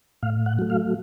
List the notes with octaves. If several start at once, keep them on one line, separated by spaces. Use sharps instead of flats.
A2 F5
F#5
F#3 A3
F5